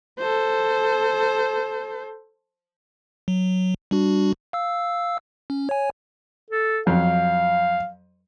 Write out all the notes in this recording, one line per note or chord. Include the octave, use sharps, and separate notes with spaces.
A4 C5
F#3
G3 D4 F#4
F5 E6
C#4
C#5 G#5
A4
F2 F#3 F5